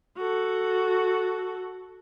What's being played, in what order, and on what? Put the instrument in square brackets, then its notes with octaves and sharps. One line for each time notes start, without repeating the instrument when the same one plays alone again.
[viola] F#4 A4